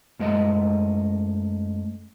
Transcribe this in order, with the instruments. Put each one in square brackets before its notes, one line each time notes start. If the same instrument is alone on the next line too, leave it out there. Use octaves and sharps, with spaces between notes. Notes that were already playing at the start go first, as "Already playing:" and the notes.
[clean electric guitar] F#2 G#3 A3 D#5